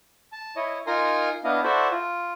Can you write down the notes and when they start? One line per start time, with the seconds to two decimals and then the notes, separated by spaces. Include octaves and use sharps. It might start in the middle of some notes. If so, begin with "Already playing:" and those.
0.32 A5
0.56 E4 C#5 D#5
0.87 D#4 F4 A#4 G#5 A#5 C6
1.44 B3 D4 E4 D#5 F5
1.64 E4 F#4 A4 C5 D5 E5
1.91 F4